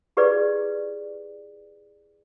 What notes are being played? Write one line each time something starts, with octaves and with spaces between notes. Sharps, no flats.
E4 G4 G#4 B4 D5